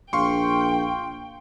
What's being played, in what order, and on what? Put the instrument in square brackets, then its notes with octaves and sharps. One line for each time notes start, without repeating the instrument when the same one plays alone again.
[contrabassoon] A#1 [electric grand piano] F5 C6 C#6 [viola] G5